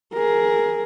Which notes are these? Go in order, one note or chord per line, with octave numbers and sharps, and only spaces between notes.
G#4 A#4